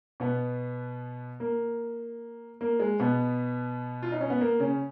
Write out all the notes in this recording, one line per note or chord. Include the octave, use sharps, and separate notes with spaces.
B2 B3
A#3
A#3
G#3
B2 B3
F4
D#4
C#4
B3
A#3
C#3 C#4